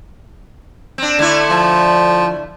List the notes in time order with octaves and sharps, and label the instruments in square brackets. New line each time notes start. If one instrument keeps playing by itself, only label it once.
[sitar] C4 D4
D3 A3 E4
[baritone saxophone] F3